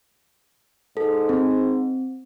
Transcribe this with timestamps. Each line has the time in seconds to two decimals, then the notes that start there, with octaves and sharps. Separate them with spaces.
0.97 G#2 A4
1.29 C4